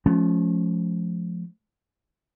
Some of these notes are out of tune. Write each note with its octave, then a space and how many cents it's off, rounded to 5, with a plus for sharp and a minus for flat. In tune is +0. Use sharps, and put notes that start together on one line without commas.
F3 +0 A3 -45 C#4 +0